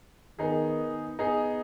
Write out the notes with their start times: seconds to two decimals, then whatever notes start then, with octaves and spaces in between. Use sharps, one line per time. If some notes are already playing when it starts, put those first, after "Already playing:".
0.39 D#3 B3 D#4 G#4
1.19 B3 D#4 G#4